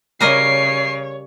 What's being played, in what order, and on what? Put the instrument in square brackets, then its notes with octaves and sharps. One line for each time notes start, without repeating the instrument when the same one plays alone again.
[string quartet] C#3 [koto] G3 A#4 D#5 [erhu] C#5 [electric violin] C7